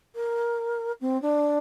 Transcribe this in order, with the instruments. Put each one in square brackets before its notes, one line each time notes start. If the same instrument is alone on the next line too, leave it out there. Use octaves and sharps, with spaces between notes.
[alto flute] A#4
C4
D4